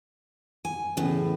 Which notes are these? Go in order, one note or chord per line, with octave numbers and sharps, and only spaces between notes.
G#5
E2 A2 C#3